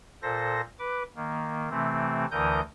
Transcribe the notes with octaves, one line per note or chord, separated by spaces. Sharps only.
A#2 A4 C5 A#6
B4 D6
D#3 A#3
C3 E3 A3 C4
D2 D3 E3 A#4 D#6 G6